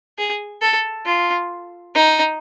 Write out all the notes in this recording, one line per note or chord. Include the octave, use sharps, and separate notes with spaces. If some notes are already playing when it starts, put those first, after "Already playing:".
G#4
A4
F4
D#4